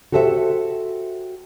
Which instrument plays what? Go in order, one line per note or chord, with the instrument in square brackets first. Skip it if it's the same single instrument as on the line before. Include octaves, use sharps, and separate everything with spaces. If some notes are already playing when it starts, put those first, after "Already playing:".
[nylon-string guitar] F#4 G4 A4 C5 D#5 E5